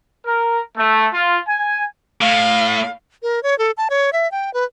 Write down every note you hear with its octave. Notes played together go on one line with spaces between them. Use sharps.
A#4
A3
F4
G#5
A2 F5
A#4
C#5
A4
A5
C#5
E5
G5
B4